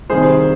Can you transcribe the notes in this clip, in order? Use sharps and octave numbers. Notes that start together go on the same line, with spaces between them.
C2 C3 D#3 G3 G#4 C5